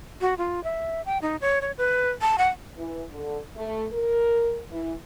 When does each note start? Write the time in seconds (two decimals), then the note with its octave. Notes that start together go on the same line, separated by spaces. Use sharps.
0.21 F#4
0.38 F4
0.64 E5
1.06 G5
1.22 D#4
1.41 C#5
1.62 C#5
1.78 B4
2.21 A5
2.38 F#5
2.77 E3
3.11 D3
3.55 A3
3.93 A#4
4.71 E3